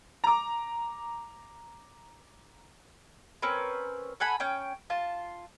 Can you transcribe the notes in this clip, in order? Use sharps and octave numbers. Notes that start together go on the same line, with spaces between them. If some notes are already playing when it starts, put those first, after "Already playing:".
A#5 D6
C4 C#4 A#4 B4
A4 F#5 G#5 B5
C#4 G5
F4 A5